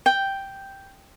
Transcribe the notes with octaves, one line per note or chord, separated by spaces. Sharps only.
G5